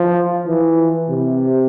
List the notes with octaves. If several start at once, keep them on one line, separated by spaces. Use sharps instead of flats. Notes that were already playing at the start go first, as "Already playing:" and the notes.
Already playing: F3
E3
C3